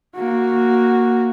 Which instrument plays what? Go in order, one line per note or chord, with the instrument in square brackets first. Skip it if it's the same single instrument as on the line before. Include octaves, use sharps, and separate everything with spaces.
[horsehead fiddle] A#3 F#4